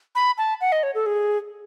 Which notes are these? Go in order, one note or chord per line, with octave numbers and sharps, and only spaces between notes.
B5
A5
F#5
D#5
C#5
A4
G#4